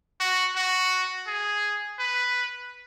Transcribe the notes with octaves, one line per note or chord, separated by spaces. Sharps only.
F#4
F#4
G#4
B4